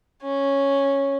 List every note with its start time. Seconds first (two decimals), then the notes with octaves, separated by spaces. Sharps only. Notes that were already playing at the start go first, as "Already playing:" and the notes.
0.22 C#4